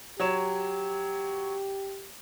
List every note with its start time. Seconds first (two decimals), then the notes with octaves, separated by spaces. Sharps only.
0.20 F#3 G4 C#5 E7